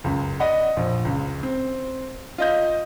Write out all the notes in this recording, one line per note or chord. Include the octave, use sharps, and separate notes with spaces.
C#2 F#2
D5 D#5 F#5 B5
A#1
C#2
C4
F4 D#5 G6